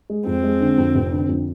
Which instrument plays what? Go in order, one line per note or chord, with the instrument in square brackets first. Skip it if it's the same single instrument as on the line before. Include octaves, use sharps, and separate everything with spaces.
[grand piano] G#3
[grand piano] F2 [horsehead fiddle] C4
[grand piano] G#3
D3
F2
F1
D3
F2